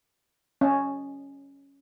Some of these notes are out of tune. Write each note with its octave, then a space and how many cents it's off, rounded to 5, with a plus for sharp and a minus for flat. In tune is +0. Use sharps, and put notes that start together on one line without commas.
C#4 +0 D#5 -20 A5 +0